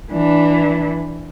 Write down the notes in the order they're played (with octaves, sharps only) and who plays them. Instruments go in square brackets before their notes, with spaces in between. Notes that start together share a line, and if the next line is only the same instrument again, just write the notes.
[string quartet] E3 D4